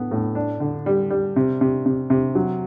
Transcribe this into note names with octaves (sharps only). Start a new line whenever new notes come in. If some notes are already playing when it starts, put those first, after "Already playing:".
Already playing: A2 B3
A2
D4
D3
G3
G3
C3
C3
C3
C3
F#3